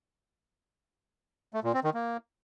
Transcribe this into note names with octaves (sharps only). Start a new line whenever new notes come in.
A3
A#2
C4
D#3
A#3